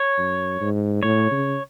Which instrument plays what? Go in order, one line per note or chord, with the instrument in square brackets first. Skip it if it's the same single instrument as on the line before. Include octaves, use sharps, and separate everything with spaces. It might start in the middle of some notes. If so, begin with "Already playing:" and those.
Already playing: [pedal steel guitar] C#5
[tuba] F#2
G#2
[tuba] A2 [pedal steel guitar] C#5
[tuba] C#3